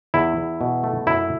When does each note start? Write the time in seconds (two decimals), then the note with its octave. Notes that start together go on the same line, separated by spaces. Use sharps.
0.14 E2 E4
0.37 E2
0.61 B2
0.83 A3
1.07 F#2 E4